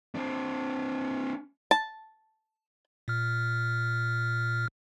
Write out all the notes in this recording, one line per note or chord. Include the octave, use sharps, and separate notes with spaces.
C4 D4
A5
A#2 F6